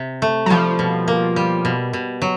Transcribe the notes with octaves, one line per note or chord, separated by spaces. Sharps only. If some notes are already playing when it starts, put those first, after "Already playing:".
Already playing: C3
A3
F#3
F3 G3
B2
A#3
G3
B2
B2
F#3